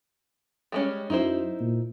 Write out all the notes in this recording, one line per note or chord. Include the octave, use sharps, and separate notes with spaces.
G3 G#3 C#4
F#2 D#4 E4 C5
A#2